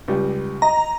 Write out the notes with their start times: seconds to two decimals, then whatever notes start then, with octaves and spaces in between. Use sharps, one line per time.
0.08 C#2 G3
0.62 D#5 A#5